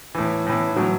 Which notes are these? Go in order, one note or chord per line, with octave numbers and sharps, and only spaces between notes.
A2 E3
A2 E3
A2 E3 F#3